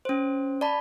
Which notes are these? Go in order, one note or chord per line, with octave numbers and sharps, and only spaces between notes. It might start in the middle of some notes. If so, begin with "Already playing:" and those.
C#4 C5
D5 A5 B5